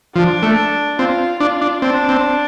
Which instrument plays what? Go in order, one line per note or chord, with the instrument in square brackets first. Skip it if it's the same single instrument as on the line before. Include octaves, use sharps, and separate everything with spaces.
[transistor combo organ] F3 [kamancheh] D4
[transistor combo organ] A3
[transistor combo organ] C4 [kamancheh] F4
[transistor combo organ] D4 [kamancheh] F4
[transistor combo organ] D4
[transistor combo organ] C4 [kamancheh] D4
[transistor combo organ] C4